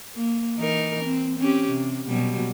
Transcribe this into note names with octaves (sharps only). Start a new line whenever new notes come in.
A#3
E3 D#4 A#4
C4
C4 C#4 G4
C3
B2 F#3 G3